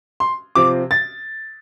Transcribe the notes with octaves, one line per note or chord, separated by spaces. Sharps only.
C6
C3 F3 C4 D6
A6